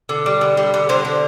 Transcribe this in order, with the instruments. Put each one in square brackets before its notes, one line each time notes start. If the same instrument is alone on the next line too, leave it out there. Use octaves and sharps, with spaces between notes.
[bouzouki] D3
G3
D3
G3
D3
D3 C5
D3